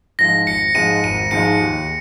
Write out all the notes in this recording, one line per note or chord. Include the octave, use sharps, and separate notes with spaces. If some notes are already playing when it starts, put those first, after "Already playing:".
G#2 F3 G#3 D#4 A#6
G#1 C#7
G#2 F3 G#3 D#4 D#7
G#1 D#7
G#2 F3 G#3 D#4 C#7
D#2